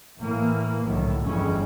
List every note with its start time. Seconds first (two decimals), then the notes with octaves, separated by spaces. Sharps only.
0.20 A2 E3 A#3
0.86 C2 A2 D3 D#3 F#3
1.24 G1 F2 E3 G3 G#3 C#4